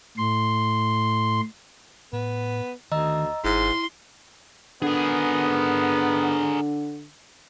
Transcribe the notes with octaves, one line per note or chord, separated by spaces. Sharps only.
A2 C6
A2 B3
D2 D#3 D#5 A#5 E6
G1 G#2 E4 C6
D3 B3 G#4 A#4